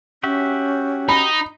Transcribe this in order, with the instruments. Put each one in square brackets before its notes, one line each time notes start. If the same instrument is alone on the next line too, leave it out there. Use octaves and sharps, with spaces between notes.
[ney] C#4 [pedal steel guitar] F#4 G4 E5
[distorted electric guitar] D#4 [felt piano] B5